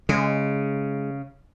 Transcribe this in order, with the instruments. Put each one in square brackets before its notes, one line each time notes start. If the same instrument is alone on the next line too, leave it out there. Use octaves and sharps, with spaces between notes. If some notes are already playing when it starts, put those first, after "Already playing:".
[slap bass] C#3 [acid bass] G#3